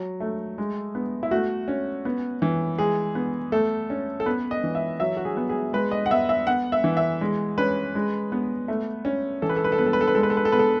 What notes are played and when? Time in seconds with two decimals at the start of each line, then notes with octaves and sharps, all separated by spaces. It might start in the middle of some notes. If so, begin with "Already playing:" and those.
Already playing: F#3
0.20 A3
0.58 G#3
0.95 B3
1.23 E4
1.31 A3 F#4
1.68 C#4
2.05 B3
2.42 E3
2.78 G#3 G#4
3.15 B3
3.52 A3 A4
3.90 C#4
4.20 A4
4.26 B3 B4
4.51 D#5
4.64 E3
4.75 E5
5.00 F#3 E5
5.17 F#4
5.25 G#4
5.37 B3
5.49 G#4
5.73 G#3 B4
5.91 D#5
6.06 F#5
6.11 B3 E5
6.29 E5
6.47 B3 F#5
6.72 E5
6.84 E3
6.97 E5
7.21 G#3
7.58 C#4 B4
7.95 G#3
8.32 B3
8.68 A3
9.05 C#4
9.42 E3 A4
9.49 B4
9.57 A4
9.64 B4
9.72 A4
9.78 B3 B4
9.86 A4
9.93 B4
10.01 A4
10.08 B4
10.15 G#3 A4
10.23 B4
10.30 A4
10.37 B4
10.45 A4
10.52 B3 B4
10.59 A4